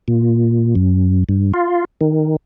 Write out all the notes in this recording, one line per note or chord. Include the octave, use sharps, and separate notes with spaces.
A#2
F#2
G2
F4
D#3